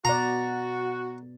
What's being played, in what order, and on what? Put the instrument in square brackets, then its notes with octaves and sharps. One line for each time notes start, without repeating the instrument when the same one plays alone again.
[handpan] B2 D5 [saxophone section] F#4 [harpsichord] A#5